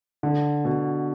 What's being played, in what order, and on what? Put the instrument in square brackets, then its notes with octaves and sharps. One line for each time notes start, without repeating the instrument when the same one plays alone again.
[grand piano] D3
B2